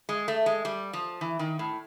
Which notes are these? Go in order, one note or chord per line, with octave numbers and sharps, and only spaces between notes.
G#3
A3
G#3
G3
F3
E3
D#3
A2